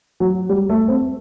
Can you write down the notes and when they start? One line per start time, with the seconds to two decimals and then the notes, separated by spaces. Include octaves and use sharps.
0.20 F#3
0.49 G3
0.69 A3
0.88 C4